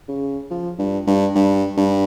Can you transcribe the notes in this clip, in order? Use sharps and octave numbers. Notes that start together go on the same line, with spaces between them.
C#3
F3
G2
G2
G2
G2